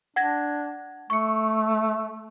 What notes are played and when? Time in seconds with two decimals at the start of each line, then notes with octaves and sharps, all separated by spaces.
0.16 D4 F#5 G#6 A#6
1.10 A3 C#6 C#7